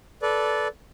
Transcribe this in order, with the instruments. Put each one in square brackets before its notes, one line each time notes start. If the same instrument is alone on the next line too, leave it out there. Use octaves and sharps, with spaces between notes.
[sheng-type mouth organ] A4 B4 D5